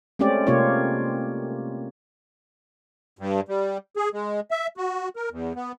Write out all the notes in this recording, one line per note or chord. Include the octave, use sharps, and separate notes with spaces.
G#3 A3 C4 C#4 G4 D5
C3 A#3 F4 G4 C#5
G2
G3
G#4
G#3
E5
F#4
A#4
E2
B3